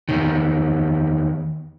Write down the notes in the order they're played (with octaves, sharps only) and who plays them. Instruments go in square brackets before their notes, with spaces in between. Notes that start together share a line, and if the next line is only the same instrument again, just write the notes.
[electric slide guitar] E2 G#2 D#3